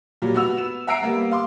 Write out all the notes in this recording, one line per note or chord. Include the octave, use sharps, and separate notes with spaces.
A#2 F#3 G3
B3 F#4 E6 F7
B3 E7
E5 F#5 A#5 E6 C7 D7
G3 A#3 B3
F5 C6 D6